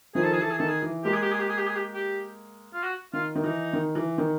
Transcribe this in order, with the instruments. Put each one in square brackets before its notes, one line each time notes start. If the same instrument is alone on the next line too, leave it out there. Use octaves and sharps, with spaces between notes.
[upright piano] D#3 F3 [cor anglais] G#4
[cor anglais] A4
G#4
[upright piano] E3 [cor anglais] A4
[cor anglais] G#4
[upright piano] D#3 [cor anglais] A4
[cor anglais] G#4
[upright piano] E3
[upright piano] G#3 A#3 [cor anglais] G4
[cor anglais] G#4
G4
G#4
G4
G#4
G4
G#4
G4
G4
F4
F#4
[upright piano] D#3 [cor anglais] F4
[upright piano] D#3
[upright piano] E3 [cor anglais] D#4
[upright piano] D#3
E3
D#3